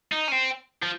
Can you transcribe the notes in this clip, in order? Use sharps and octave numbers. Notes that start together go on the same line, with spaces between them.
D#4
C#4
C4
F3